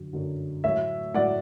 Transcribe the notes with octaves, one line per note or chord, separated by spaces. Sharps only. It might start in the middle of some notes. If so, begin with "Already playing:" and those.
Already playing: F#2 D3 F#3
F#2 D3 F#3
A2 F#3 C#5 E5
A2 F#3 D5 F#5